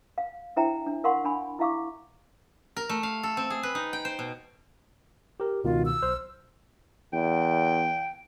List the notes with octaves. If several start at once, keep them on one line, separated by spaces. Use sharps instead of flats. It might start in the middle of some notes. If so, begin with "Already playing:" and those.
F5
D4 E4 C5 E5 G5 A#5
D4
A#4 F5 F#5 C6 C#6
D4 G#5 B5
E4 E5 F5 C#6 D6
A#4
A3
F5
A4
C4
G#4
B4
D#4
G5
C5
B2
G4 A#4
C#2 B2 D#3 F4
E6
B1 C5 F6
E2 G5